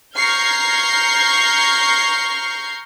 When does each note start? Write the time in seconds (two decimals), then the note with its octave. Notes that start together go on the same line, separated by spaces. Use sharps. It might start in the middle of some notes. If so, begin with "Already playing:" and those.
0.16 A#5 C#6 F6 G6 G#6 C7